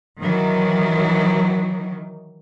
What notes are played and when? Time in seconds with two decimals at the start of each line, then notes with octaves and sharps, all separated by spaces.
0.20 D#3 E3 F#3